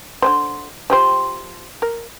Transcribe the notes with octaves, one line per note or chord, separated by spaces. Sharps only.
D3 D#3 C5
F3 G4 C5
A#4